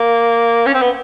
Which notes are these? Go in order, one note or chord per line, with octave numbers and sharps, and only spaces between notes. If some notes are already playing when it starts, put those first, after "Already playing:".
Already playing: A#3
C#4
C4
B3